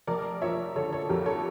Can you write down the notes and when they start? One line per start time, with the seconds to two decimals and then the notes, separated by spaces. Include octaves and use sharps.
0.07 F1 A#4 D5
0.42 F3 C#5 E5
0.76 D3 A4 C#5
0.93 A4 C#5
1.09 F2 G4 A#4
1.26 A4 C#5